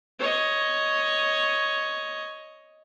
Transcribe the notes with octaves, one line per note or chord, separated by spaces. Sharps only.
C#5 D#5